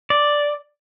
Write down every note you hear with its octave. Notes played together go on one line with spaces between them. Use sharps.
D5